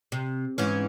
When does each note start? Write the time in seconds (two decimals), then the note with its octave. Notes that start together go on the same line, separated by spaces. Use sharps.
0.12 C3
0.58 G#2 E3 C#4